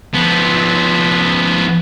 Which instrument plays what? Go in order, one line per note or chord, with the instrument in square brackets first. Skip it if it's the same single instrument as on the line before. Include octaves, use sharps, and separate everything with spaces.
[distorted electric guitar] F3 B3